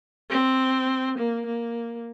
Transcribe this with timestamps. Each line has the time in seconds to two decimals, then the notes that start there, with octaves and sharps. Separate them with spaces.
0.30 C4
1.18 A#3
1.46 A#3